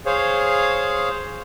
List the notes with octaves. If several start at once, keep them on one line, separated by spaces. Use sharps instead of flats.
G#4 C5 C#5 F5